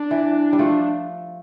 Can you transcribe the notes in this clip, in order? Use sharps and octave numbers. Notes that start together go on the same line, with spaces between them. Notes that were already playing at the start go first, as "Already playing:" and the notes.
Already playing: D4
E3
G3
F3 A3